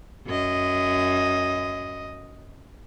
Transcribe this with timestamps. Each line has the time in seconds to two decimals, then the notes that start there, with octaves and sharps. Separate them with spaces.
0.27 F#2 D#5